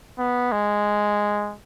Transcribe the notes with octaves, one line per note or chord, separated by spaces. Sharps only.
B3
G#3